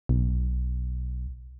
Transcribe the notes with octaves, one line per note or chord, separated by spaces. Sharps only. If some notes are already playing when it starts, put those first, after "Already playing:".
B1